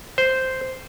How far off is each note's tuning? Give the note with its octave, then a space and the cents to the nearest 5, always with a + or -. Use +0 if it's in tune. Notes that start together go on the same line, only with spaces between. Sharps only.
C5 -5